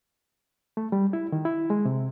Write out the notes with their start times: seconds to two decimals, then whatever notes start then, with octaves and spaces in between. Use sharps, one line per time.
0.77 A3
0.92 G3
1.13 E4
1.32 D#3
1.45 E4
1.70 G#3
1.85 C3